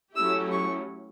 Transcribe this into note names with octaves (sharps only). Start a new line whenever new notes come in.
F#3 A3 C#4 E4 G4 E6
C#6